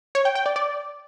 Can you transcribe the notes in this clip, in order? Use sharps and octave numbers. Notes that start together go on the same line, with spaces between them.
C#5
G5
G5
D5
D5